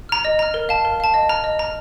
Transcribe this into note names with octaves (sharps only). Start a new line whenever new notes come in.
A#5 F6
D#5
A#5 F6
A#4
F5 A5
A#4
F5 A5
D#5
A#5 F6
D#5
A#5 F6